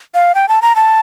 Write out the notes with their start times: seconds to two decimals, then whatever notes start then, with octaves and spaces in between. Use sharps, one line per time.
0.14 F5
0.35 G5
0.48 A5
0.62 A#5
0.76 A5